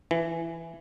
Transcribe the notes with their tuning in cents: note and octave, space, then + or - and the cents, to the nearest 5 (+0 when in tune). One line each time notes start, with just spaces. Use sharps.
E3 +10